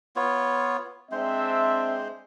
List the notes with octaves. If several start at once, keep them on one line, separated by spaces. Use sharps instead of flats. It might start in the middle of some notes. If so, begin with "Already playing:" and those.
B3 F4 C#5
G#3 C4 D4 C5 E5